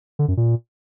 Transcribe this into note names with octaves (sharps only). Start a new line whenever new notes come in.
D3
F#2
A#2